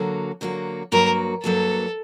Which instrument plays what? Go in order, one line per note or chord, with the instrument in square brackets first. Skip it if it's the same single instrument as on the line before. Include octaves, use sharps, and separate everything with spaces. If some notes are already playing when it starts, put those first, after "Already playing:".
Already playing: [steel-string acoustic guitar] D3 F#3 A#3 F#4
D3 F#3 A#3 F#4
[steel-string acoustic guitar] G2 F#3 A#3 F#4 [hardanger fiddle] A#4
[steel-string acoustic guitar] G2 F#3 A#3 F#4 [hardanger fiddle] A4